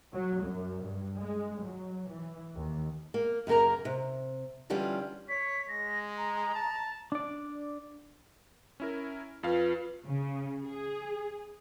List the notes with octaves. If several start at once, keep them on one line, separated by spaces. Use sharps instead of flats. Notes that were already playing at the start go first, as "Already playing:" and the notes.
F#3
F#2
G2
G#3
F#3
E3
D#2
A#3
F#2 C#3 A#3 A#4 A#5
C3
D3 E3 G3 C#4 F4
C#5 B6
G#3 A#6
A#5
A5
D4 D5
C#4 E4 A#4
F2 F4 B4 F5
C#3
G#4